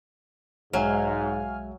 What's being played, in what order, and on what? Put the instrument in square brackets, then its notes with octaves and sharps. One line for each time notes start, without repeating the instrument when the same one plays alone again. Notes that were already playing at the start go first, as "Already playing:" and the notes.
[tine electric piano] B1 G#3 E5 [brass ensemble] G#2 [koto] F#3 [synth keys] F5 G#5 F6